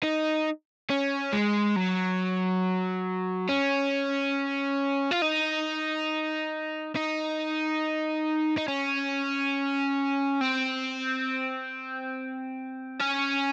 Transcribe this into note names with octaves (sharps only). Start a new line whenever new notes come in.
D#4
C#4
G#3
F#3
C#4
F4
D#4
D#4
D#4
C#4
C4
C#4